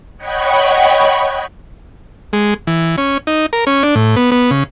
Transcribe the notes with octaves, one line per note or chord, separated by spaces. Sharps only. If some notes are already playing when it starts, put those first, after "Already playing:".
C#5 D#5 F#5 G5 B5 C#6
G#3
E3
C#4
D#4
A#4
C#4
D4
A2
B3
B3
C#3